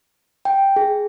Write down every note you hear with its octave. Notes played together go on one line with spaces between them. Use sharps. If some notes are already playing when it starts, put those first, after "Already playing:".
G5
G#4